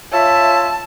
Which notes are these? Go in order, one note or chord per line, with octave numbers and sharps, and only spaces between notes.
F4 C#5 E5 A5